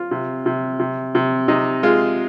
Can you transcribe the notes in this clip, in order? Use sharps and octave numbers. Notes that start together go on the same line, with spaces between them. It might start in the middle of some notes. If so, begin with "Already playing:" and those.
Already playing: F4
C3
C3
C3
C3
C3 D#4
G#3 F4